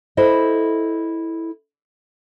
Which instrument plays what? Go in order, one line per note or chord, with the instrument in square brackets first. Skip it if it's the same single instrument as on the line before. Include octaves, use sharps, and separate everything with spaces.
[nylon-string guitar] E4 A4 C5 D#5